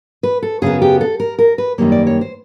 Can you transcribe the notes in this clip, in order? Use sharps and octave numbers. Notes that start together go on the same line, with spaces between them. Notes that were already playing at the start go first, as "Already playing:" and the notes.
B4
A4
F#2 C#3 F#3 B3 G#4
G4
A4
A#4
A#4
B4
F#2 D#3 G3 A#3 C#5
D5
C#5
C5